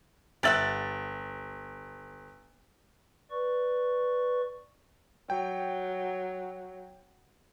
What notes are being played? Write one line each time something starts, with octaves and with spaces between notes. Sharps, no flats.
G1 G4 E5 F#5 A6 F#7
B4 D5 C#6
F#3 G5